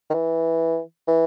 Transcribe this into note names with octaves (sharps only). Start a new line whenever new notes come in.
D#3
E3
E3